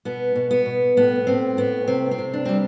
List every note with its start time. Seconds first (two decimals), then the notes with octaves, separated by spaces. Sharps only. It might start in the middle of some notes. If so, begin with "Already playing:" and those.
0.05 B2 B3
0.35 B2
0.51 B3
0.66 B2
0.97 A2 B3
1.27 A2 C4
1.57 A2 B3
1.88 C3 C4
2.11 C4
2.18 C3
2.33 D4
2.45 G3 C4